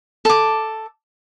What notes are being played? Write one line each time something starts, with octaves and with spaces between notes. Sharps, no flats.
A4 D6